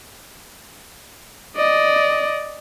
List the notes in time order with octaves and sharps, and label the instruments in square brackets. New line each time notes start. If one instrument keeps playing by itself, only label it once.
[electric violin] D5 D#5